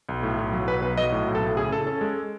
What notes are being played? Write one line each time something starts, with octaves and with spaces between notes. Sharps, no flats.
B1
A2
B1
F#3
B1 B4
B1 B4
F#3 D#5
A2
B1
A4
A2
C#3 G#4
C#3 A4
C#4 A4
G#3